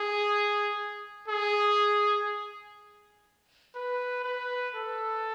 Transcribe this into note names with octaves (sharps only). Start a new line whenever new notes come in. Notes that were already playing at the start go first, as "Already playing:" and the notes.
Already playing: G#4
G#4
B4
B4
A4